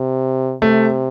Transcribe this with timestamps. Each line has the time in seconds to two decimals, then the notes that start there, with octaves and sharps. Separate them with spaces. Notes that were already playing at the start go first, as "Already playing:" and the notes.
Already playing: C3
0.62 C3 A3